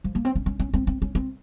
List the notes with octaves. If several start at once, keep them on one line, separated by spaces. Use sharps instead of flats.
F3
A#3
C4
C#4
C#4
C#4
C4
C4
C#4
C4